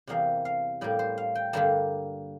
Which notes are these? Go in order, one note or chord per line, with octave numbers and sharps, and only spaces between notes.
E2 C3 G3 A#3 F5
F5
A2 G3 A#3 D5
C5
F5
G5
G2 D3 G3 A#3 A5